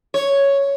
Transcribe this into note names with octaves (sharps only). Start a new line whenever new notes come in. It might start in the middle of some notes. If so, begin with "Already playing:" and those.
C#5